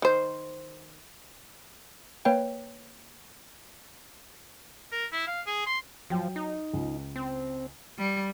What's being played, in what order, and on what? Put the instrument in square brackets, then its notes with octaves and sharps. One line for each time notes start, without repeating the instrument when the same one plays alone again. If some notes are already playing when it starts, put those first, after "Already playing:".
[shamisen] D#3 C5
[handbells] A#3 B4 C#5 G5
[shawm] A#4
E4
F5
G#4
C6
[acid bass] F3 [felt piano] F#3 G5
[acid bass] D#4
[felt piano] C#2
[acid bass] C4
[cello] G3